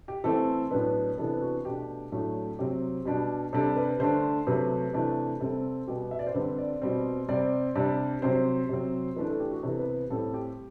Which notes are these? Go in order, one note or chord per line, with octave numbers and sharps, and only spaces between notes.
G4
E3 A3 C4 A4
A2 F#3 B3 D4 B4
C3 E3 B3 D4 A4
F#4
B2 A3 D4 G4
A2 F#3 A3 D4
C3 F#3 C4 G4
B2 G3 D4
C3 G3 D4 A4
B4
D3 A3 D4 C5
C3 F#3 A3 B4
C3 E3 A3 D4
C3 G3 C4 A4
B2 G3 B3 G4
E5
D5
C5
D3 G3 C4 B4
D5
B2 G3 C4
C3 G3 C4 D5
C3 G3 D4
C3 F#3 C4 C5
C3 F#3 C4
E3 A3 D4 B4
A4
G4
F#4
C3 E3 B3 A4
B4
A2 G3 C4 A4
G4